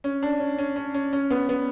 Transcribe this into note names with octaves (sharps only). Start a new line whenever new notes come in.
C#4
D4
C#4
C#4
C#4
C#4
C#4
B3
B3